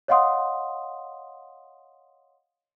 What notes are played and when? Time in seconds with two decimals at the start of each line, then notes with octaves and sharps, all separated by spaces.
0.08 C#5 D#5 F5 F#5 C6 D#6